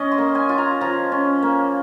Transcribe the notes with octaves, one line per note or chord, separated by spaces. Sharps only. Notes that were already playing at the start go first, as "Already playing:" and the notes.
Already playing: C#4 D#5
C6
A#3
G#5
F4
A#5
F3 A#5
C#4
A#3